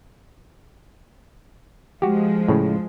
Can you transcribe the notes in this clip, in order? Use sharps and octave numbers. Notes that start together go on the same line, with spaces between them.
F3 G#3 F#4 G4
A2 C#3